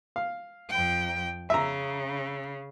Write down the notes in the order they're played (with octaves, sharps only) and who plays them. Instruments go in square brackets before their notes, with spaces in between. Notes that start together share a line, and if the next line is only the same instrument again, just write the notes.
[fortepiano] F5
[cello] F2 G5
[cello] C#3 [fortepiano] E5 A#5